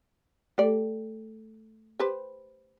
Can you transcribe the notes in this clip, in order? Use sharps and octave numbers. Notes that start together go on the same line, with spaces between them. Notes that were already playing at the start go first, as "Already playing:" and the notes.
A3 G4 A4 D5
G4 B4 C5